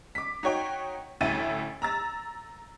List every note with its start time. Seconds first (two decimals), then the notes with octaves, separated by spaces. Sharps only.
0.15 D6 B6
0.43 D#4 F#4 C#5 G5
1.21 A1 D2 A2 E5 A6 D#7
1.82 A#5 E6 A6